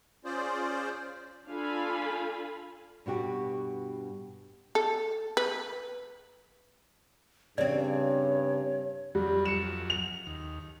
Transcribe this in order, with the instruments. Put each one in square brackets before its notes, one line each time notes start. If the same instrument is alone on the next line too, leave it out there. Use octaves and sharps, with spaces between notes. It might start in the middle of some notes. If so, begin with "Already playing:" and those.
[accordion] C#4 F4 G#4 C5 D5
[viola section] D4 F4 A4 F5 G#5 B5
[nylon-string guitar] G2 B2 F#4 G4
[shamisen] A4
B4
[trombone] G2 [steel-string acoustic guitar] C#3 C4 [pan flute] C#5 [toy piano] D5
[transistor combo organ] F2 F#3 [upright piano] G3
[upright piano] C#7 E7
F7
[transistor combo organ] D#2